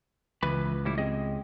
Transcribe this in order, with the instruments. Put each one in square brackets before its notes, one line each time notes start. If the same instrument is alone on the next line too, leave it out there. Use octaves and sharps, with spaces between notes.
[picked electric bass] C#2 [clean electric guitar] E3 B4 B5
[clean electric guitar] A2 G3 E4
C4 G#4 D#5